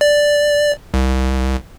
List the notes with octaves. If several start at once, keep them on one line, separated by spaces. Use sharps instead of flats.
D5
C2